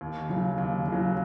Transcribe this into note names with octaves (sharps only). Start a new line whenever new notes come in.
D#2
C#3 F#3
D#2
C#3 F#3